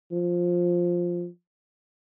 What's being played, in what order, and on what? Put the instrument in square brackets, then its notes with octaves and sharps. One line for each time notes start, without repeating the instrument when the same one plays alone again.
[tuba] F3